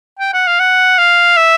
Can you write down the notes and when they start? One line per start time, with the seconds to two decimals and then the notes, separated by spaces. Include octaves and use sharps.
0.19 G5
0.33 F#5
0.47 F5
0.59 F#5
0.98 F5
1.37 E5